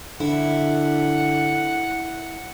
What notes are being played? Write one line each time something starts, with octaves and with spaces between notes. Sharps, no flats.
D3 E4 F#5